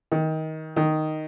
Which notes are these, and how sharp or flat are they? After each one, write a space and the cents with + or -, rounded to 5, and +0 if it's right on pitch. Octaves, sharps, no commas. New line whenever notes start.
D#3 +20
D#3 -5